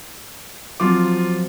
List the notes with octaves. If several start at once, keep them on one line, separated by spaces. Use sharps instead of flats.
F3 F#3 C4 F4 D6